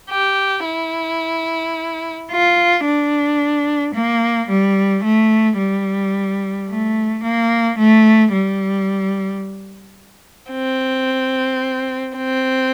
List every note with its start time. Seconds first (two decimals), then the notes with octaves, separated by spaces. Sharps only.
0.10 G4
0.65 E4
2.30 F4
2.85 D4
3.94 A#3
4.48 G3
5.03 A3
5.58 G3
6.68 A3
7.23 A#3
7.78 A3
8.33 G3
10.52 C4
12.16 C4